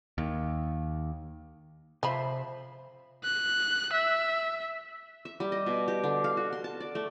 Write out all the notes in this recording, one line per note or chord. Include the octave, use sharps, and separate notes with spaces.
D#2
C3 F3 C5 E5 B5
F#6
E5
E5
G3
D#5
B2
G4
D3
F5
F#4
C6
A5
D5
A3